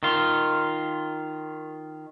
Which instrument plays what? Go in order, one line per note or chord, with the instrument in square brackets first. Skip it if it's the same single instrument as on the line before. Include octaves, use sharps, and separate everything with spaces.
[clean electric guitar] D#3 F4